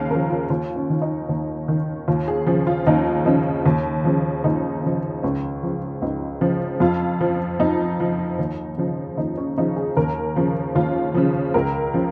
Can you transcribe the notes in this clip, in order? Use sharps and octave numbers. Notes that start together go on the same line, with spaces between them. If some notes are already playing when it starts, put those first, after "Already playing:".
Already playing: D#2 C#3 F5
C#3 F3 A#4
F4
D#2 F4
C#4
D#3
D#4
D#2
D#3
D#2 F4
G#4
C#3 F3 G#4
F4
D#2 D#4
C#3 F3 D#4
D#2
C#3 F3
D#2 D#4
C#3 F3
C#2 C#4
C#3 F3
C#2 D#4
C#3 F3
F2 F4
F3
F2 D#4
F3
D#2
C#3 F3
D#2 D#4
C#4
C#3 F3 D#4
G#4
D#2 A#4
C#3 F3
D#2 F4
C#3 F3
C#2 A#4
C#3 F3